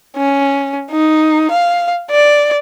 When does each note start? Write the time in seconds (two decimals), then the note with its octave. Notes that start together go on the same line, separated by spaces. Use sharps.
0.17 C#4
0.91 D#4
1.51 F5
2.11 D5